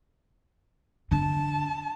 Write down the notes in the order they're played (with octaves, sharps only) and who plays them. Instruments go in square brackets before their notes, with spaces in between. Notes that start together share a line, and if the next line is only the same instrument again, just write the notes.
[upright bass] D3 D4 [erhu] A5